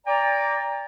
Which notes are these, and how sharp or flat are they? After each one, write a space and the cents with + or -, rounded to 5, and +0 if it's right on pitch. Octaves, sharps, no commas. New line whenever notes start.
D5 -15 G5 +35 A#5 +0